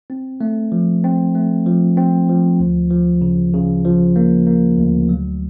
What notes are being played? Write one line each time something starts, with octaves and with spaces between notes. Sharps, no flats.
C4
A3
F3
C4
A3
F3
C4
F3
D2
F3
C#3
C#3
F3
A#3
A#3
D2
F#3